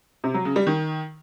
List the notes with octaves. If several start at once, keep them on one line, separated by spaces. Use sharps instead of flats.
C3
F#3
C#3
G3
D#3